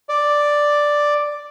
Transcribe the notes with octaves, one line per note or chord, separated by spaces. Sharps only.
D5